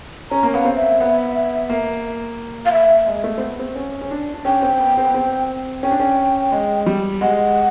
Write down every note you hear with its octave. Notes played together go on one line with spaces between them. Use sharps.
C#4 A#5
A#3
B3 F5
C4
E5
B3
A#3
F5
E5
G#3
A3
C4
B3
C4
C#4
C#4
D4
D4
C#4 G5
C4
B3
C4
B3
C4
C#4 G5
D4
C#4
G#3
G3
G#3 F#5